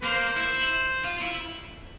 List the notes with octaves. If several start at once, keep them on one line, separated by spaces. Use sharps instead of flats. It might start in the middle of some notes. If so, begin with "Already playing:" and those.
A#3 C5
E4
F4
E4